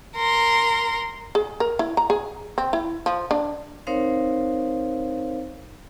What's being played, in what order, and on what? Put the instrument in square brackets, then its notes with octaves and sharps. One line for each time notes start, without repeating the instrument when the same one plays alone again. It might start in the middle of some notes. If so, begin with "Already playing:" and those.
[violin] A#4 C6
[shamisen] G#4
A#4
E4
A#5
G#4
C4
E4
F3
D4
[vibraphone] C4 D#4 A#4 C5 C#5 F5